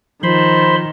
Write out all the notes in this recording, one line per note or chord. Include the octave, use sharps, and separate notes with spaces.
D#3 F3 F4 C5 B5 C6